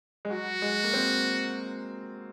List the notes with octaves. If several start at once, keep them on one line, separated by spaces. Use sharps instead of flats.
G#3
F#3 F#4
G#3
A#3
C4